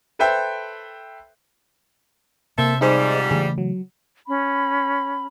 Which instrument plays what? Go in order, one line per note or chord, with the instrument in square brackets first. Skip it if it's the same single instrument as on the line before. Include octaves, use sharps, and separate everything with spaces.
[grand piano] A4 B4 C5 E5 G5
[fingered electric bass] C3 [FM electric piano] A#3 [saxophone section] A4 C5 E5
[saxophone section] G#2 F3 G3 [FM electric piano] D#4 G#4 C5
[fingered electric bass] C#3 E3 A3 [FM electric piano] G#4
[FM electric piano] F#3
[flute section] C#4 B5